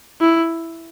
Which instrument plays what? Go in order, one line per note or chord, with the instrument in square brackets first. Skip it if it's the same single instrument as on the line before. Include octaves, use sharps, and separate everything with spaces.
[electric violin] E4